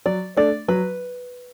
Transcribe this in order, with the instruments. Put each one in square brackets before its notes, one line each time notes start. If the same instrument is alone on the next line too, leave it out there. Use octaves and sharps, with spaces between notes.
[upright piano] F#3 [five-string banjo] D5
[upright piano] A3 D4 [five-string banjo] D5
[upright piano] F#3 [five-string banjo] B4